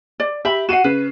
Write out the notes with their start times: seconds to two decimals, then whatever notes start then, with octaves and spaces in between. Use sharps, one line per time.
0.20 D5
0.45 G4 E5 B5
0.69 F#4 F#5 C7 D#7 E7
0.84 C#3 B4